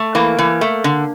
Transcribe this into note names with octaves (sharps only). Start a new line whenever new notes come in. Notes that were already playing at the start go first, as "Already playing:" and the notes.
Already playing: A3
E3 A#3
E3
A3
D3